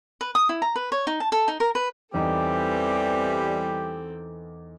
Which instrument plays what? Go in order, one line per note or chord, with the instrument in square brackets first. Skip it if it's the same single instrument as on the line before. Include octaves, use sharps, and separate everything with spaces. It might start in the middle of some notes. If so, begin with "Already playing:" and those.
[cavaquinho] B4
D#6
E4
A#5
B4
C#5
D#4
A5
A4
D#4
A#4
B4
[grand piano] E2 D#4 [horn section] E3 G3 [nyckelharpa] C4 A4 [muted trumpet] G4